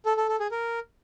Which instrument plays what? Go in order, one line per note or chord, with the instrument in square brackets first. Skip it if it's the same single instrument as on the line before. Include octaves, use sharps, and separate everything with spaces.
[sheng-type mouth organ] A4
A4
A4
G#4
A#4